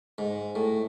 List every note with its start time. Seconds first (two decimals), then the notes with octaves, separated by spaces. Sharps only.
0.18 G#2
0.55 A2